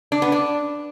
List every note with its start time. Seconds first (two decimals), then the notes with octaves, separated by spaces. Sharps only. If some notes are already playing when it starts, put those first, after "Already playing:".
0.12 D4
0.22 B3
0.32 D4